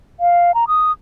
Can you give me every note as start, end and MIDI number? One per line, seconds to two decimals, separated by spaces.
0.20 0.54 77
0.54 0.65 82
0.68 0.92 87